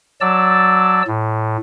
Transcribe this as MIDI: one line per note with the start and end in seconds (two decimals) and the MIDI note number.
0.21 1.02 54
0.21 1.02 74
0.21 1.02 81
0.21 1.02 88
1.07 1.57 45